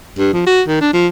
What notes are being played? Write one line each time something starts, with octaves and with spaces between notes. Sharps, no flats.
G2
F3
F#4
D#3
D4
F3